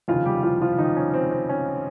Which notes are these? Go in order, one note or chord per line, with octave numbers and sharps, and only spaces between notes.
F1 D#2 C#3 F3 F4 F5
G3 G4
F3 F4
F3 F4
D#3 D#4
C#4
C4
C4
C#4